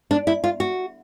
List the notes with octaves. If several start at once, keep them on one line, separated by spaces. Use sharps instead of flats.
D4
E4
F4
F#4